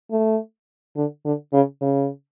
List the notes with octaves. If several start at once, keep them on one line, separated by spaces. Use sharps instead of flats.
A3
D3
D3
C#3
C#3